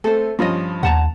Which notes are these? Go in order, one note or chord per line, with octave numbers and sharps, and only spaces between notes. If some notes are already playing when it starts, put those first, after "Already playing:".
A3 C4 A4 C5
G2 F3 C#4 F4 D#5
D#2 F#5 A5 A#5